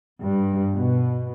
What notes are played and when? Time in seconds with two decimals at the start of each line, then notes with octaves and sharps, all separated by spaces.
0.22 G2
0.75 B2